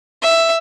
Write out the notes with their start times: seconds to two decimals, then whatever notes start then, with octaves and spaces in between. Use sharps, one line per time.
0.22 E5